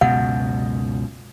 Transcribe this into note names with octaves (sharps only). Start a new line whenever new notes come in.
C#2 F#2 B2 F#5